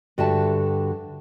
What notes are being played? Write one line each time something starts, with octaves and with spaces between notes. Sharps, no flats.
G2 D3 F#4 E5 G5 A5